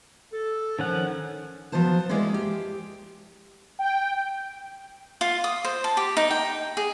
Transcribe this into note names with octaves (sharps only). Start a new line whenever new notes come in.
A4
D#3 F3 C#4 F#5
F3 F#3 B3 C5 A5
G3 G#3 A#3 E4 G#4 D5
G4
G5
F4
D#6
C5
A5
G4
D#4
G5
G#4